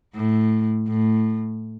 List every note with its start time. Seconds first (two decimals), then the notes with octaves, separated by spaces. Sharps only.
0.15 A2
0.87 A2